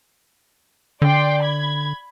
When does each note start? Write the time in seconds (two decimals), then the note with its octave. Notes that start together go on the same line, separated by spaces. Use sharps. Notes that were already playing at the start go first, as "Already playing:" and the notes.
1.02 D3 D5 G5 C6
1.41 B5 G#6